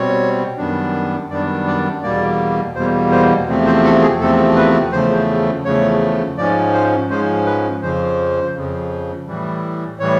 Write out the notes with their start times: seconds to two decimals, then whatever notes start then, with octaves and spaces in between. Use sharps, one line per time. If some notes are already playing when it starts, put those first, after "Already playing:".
Already playing: B2 G3 C4 C#5
0.58 F#2 D#3 G3 B3 D4
1.30 F#2 D#3 G3 B3 D4 D5
1.67 D5
2.03 E2 B2 G3 A#3 D5
2.75 E2 B2 G3 A#3 C5
3.11 C5
3.48 E2 C3 F3 A3 C4
3.66 C5
3.84 A4
4.02 G#4
4.20 E2 C3 F3 A3 C4 A4
4.56 B4
4.92 E2 C#3 F3 A3 C5
5.65 E2 C#3 F3 A3 C#5
6.38 G#2 F3 G#3 C#4 D5
6.73 C5
7.10 G#2 F3 G#3 C#4 C5
7.46 B4
7.82 F2 C#3 F3 C5
8.55 F2 C#3 F3
9.27 A2 E3 G3
10.00 A2 E3 G3 C#5